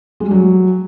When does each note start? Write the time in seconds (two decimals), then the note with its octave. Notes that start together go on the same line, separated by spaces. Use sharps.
0.20 G#3
0.26 G3
0.31 F#3